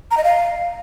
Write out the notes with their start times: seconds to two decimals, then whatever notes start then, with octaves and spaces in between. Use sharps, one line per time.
0.11 A#5
0.17 D#5
0.24 F5